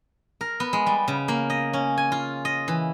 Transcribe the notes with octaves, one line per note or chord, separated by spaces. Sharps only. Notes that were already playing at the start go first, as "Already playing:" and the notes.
A#4
B3
G#3
G3
C#3
A#3
D#5
C#4
G#5
F4
D#5
E3